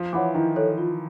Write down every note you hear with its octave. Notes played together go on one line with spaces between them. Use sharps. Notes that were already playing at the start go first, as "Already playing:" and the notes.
Already playing: F3
E3 C#5 F#5 B5 D6
D#3 E4
A4 C#5
F4